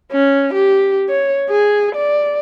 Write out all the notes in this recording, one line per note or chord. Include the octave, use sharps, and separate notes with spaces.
C#4
G4
C#5
G#4
D5